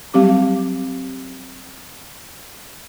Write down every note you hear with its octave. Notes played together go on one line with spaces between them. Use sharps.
F#3 G3 C4 G4 D6